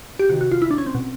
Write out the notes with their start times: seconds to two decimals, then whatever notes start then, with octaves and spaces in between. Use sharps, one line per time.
0.19 G4
0.29 C3 D#3 F#4
0.41 F#4
0.52 F4
0.62 E4
0.71 D4
0.78 C#4
0.86 C4
0.95 B2